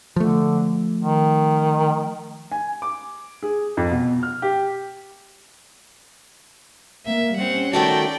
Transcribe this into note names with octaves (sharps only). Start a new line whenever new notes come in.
D3 F3 A3
D#3
G#5
D6
G#4
F2
B2
F6
G4
A#3 E5
G3 C4 C#4 F#5
D#3 A3 F#4 D5 G5 A5